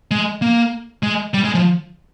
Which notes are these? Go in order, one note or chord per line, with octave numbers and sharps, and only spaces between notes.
G#3
A#3
G#3
G3
G#3
F3